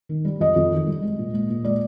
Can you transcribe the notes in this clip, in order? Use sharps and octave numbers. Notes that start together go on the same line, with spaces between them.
D#3
G3
F2 D#5
F2
D#3
G3
G#3
A#2
G#3
A#2
G#3 D5